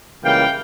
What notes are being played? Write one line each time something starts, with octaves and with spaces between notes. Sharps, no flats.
C#2 C#3 E3 G3 A#3 F5 G5